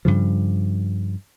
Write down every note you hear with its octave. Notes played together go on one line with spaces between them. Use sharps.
G2 C#3 F3